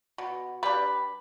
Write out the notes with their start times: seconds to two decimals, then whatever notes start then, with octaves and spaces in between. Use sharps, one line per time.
0.18 B2
0.63 G3 D4 B4